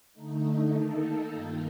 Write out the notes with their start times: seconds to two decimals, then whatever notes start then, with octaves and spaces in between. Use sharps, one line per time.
0.13 D3 A3 D#4
0.72 D#3 A#3 D#4 A4
1.32 G2 D#3 A#3 F4